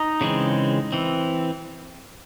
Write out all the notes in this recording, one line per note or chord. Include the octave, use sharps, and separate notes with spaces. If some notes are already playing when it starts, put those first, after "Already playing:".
Already playing: D#4
C#3 E3 G#3 C4
E3 C4